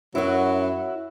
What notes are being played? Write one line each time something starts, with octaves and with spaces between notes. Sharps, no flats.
F#2 F#3 E4 F#4